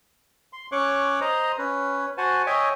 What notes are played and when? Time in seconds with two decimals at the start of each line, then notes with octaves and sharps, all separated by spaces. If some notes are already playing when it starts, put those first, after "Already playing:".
0.53 C6
0.72 C#4 C#5 C#6 D6 F#6
1.21 C5 D#5 A#5
1.58 C#4 B4
2.18 F#4 C5 F#5 G#5 A5
2.46 C#5 D#5 E5 G5 G#5